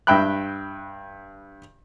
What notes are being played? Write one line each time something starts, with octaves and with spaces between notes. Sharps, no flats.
G2 E5 G5 B5 F#6